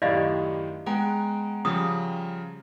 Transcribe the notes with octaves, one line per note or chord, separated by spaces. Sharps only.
F#2 A2 D#3 E4 G4 D5 D#5 F5
G#3 B3 F#5 G5 A#5
C#3 F3 G3 D#6